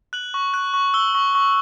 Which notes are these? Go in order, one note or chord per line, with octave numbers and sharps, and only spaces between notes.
F#6 F#7
C#6
F#6
C#6
E6 G7
C#6
C#6